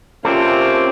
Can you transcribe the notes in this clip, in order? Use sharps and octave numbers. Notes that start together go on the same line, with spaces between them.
C3 A#3 C4 C#4 F4 A4 D5